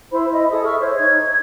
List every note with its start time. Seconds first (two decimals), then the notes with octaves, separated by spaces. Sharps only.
0.11 E4 C5 B5
0.32 D#5 E5 B5
0.50 G#4 A4 D#6
0.64 E5 C#6 E6 F6
0.80 C5 C#5
0.97 D#4 G#6